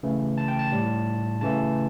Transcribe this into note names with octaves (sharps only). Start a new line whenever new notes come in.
C#3 E3 A3
A5
G5
A5
A2 G3
C#3 E3 A3 A5